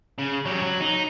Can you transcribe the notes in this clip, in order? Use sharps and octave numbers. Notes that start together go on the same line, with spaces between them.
C#3
F#3 G4
F#3
D#4